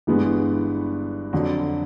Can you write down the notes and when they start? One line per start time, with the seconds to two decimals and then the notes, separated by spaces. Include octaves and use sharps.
0.07 G1 G2 E3 G#3 B3
1.33 F2 D3 F#3